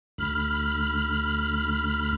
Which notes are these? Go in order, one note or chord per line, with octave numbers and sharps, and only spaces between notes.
D2 B5 F6